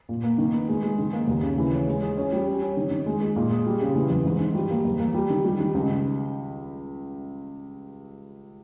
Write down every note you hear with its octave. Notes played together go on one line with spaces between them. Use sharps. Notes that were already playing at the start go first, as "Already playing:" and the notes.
A#2
A#3
D#3
B3
G#3
G#3
D#3
A#3
D#2
C#3
E3
C#4
G#3
G#4
C#4
G3
C#4
C#4
D#3
D#3
G#3
G#3
A#2
G#4
G3
C#3
E3
E2
G#2
D#3
G3
A#3
E2
A#3
G3
D#3
G3
D#3
C#2